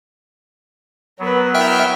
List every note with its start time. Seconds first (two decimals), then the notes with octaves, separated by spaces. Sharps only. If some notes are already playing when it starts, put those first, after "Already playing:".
1.19 F#3 B3 A#4 B4
1.54 E4 A#4 E5 G5 F6